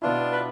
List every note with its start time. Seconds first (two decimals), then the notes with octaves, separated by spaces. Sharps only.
0.02 B2 B3 D4 E4 F4
0.32 B4